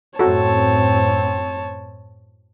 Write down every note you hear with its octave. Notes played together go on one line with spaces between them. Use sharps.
F#2 A2 C4 F#4 A4 C#5 A5